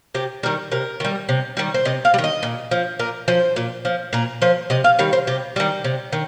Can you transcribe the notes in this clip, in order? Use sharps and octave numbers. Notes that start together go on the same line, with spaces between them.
C3 G4
D#3 G3 A#4
C3 A#4
D#3 G3
C3
D#3 G3
C5
C3 D#5
F5
G3
D#3
D#5
A#2
F3
A#2 A#4
F3 C5
A#2
F3
A#2 A#4
F3 C5
C3 D#5
F5
D#3 G3 F5
C5
C3 G4
D#3 G3 G4
C3
D#3